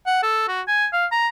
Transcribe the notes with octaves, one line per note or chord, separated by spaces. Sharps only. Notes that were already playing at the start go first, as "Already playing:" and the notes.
F#5
A4
F#4
G#5
F5
A#5